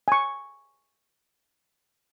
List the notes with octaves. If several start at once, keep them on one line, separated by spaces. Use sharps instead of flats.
G#5 C#6